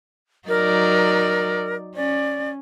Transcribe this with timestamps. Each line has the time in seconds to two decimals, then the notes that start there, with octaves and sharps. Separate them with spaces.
0.48 F#3 D#4 A#4 D5
1.96 C#4 D5